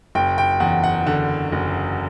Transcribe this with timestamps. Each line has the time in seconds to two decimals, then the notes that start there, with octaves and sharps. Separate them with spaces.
0.15 F#1 G5
0.38 G5
0.60 E2 F#5
0.84 F#5
1.06 D3 F#5
1.52 F#1